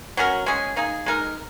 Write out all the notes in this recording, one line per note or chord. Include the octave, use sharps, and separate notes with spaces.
F#3 C#4 F#4 A#4
G#3 C#4 G#4
A#3 D#4 G#4
G#3 D#4 A#4